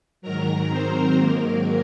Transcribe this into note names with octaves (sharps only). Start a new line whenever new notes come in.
G#2 D#3 F#3 A#4 A#5
C4 C5
G#2 D#3 F#3 A#3 A#4